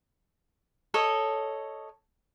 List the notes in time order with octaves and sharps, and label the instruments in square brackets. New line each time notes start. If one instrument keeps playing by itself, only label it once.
[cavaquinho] A4 C#5 D#5